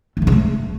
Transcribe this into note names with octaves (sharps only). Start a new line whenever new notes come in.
A3
D3
C#3
A3